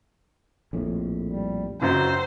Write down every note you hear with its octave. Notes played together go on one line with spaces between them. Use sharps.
A#1 F2 A2
G3
C#2 F#2 F#4 C5